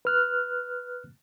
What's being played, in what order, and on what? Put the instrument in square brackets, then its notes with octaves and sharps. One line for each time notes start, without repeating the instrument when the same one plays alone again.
[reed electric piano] B4 F6 F#6